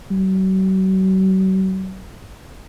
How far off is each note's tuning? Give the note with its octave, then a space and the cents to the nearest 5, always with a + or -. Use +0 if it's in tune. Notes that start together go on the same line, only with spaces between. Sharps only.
F#3 +40